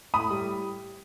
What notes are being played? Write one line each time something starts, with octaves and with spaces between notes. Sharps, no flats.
A2 B5 D#6
G3